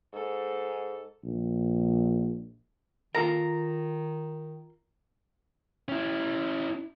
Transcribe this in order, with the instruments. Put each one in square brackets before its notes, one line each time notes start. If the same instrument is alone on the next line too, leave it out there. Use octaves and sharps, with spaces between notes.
[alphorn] G#2 [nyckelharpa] A4
[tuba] A#1
[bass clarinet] D#3 [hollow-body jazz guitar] F4 A4 A#4 [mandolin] A#5
[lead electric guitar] C#4 E4